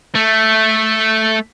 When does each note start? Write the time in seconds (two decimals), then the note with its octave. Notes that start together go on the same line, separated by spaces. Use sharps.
0.15 A3